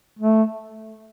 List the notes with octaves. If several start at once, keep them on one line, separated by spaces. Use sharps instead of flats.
A3